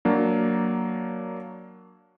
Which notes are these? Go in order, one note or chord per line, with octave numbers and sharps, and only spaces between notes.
F#3 A#3 D4